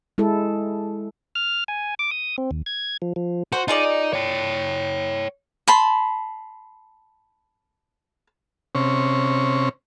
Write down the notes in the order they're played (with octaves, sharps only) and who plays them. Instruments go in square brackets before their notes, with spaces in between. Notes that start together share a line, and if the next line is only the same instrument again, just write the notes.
[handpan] G#3 E4 A4
[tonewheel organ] F6
G#5
D6
D#6
C4
D#2
G#6
F3
F3
[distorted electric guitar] F#4 [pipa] C5
[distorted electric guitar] D#4 [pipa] F4 G#4 D5
[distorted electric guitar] C#5 G5
[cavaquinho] A5 B5 C6
[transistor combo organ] C3 C#4